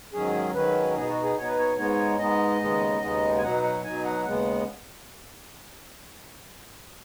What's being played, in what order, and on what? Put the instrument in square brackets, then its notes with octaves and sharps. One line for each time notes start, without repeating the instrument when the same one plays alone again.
[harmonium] G#2 D#3 F#3 C#4 G#4
G#2 D#3 F#3 C#4 B4
B2 B3 D#4 G#4
F#4
G#4
B2 B3 D#4 C#5
B4
C#5
G#2 G#3 B3 D#4 C#5
G#2 G#3 B3 D#4 D#5
D#2 C#3 G#3 B3 D#4
D#2 C#3 G#3 B3 D#4
G#5
B2 F#3 D#4 F#5
F#5
B2 F#3 D#4 G#5
F#5
D#2 C#3 G#3 B3 F#5